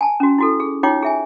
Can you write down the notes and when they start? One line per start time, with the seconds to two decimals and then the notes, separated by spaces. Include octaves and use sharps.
0.01 G#5 A5
0.20 C#4 F#4
0.38 E4 F#4 A4
0.60 G#4
0.83 D#4 F4 C#5 G5 D6
1.02 G#4 E5 G#5